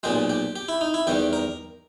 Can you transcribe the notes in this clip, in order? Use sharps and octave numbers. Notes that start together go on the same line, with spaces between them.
B1 A#2 G#3 G4
G4
G4
E4
D#4
E4
E2 D#3 G3 G4
A#4